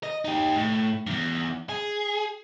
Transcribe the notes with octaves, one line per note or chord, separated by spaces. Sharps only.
D#5
D#4 G4
A2
E2 G2
G#4